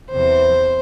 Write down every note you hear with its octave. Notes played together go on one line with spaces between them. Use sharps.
E2 C3 E3 C5